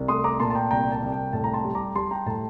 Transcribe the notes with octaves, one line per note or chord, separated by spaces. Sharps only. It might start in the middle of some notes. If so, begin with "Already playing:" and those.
Already playing: C2
A3 C6 D#6
A#5 D6
A#2 A5 C6
A5
G5 A#5
C2 G5 A#5
A5
C2
G5
A2 A5
A#5
A5 C6
G3
A#5 D6
G3 A5 C6
G5 A#5
A2 A5